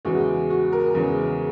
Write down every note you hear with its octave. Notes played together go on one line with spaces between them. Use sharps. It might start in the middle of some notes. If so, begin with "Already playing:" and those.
E2 C#3 G#3 F#4
F#4
A#4
E2 C#3 G#3 G#4